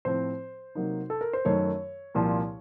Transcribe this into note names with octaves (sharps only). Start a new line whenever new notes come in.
A2 F3 C4 C5
C3 F#3 A#3 D#4
A4
A#4
C5
F#2 D#3 A3 C#5
C2 A#2 F3